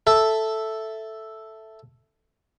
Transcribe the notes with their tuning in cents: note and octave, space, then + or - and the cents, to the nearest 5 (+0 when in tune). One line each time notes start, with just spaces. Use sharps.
A4 +0 E5 +0